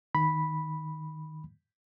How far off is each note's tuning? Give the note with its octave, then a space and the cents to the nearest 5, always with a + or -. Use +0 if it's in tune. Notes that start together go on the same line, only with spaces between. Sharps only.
D#3 +0 B5 -5